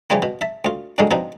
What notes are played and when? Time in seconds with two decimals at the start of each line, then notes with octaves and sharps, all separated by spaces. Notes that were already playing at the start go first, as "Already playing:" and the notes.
0.10 C#3 E3 F3 G3 A#3
0.22 B2
0.41 E5 A5
0.65 D2 F4
0.98 E2 G2 B2 D3 G#3 A#3
1.11 B2 F3 C4 D4 D#4